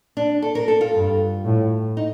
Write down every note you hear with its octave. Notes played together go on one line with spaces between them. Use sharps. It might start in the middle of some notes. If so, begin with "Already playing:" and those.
D4
A4
A#4
A4
F4
G2
A2
D#4